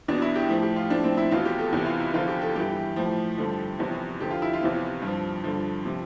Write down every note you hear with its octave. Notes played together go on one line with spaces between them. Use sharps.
E2 B2 D4
E4
G4
A2 F3
G4
F4
A2 F3 D4
C4
E4
E2 B2 F4
G4
A4
E2 C3 E3
F4
E4
E2 D3 F3 F4
G4
A4
G2 E3 G4
A2 F3
G2 D3 F3
E2 C3 F3
F2 D3 F3 G4
F4
E4
F4
E2 C3 F3
G2 F3
G2 D3 F3
C3 F3